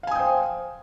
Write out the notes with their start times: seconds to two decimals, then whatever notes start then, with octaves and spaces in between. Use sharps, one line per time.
0.03 F5
0.07 G#5
0.11 D#6
0.15 G5
0.19 C5